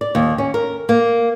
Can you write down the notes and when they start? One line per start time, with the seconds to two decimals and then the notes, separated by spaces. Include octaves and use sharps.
0.01 D5
0.15 D#2
0.38 C#4
0.54 A#4
0.89 A#3